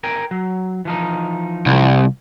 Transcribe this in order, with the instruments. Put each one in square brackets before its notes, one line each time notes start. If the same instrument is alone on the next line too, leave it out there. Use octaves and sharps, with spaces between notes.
[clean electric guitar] A#4 G5 G#5
F#3
E3 F3 D#4
[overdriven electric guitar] C2